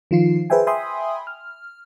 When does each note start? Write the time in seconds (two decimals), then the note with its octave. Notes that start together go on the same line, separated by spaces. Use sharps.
0.11 D#3 F3 F4 C7
0.50 G#4 B4 C5 E5 G5 G#5
0.67 E5 G5 G#5 B5 C6 D#6
1.27 F6